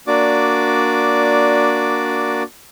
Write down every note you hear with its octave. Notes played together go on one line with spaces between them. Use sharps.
A#3 D4 F#4 D5 D6